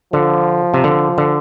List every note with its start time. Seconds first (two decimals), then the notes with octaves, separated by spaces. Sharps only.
0.13 D3 F3
0.74 C3
0.84 D3
1.18 D3